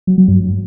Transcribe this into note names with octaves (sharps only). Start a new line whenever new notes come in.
F#3
F#3
G2